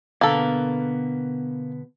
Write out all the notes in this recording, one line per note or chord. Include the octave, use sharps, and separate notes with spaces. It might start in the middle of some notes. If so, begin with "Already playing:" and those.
B2 D3 A#3 B3 A4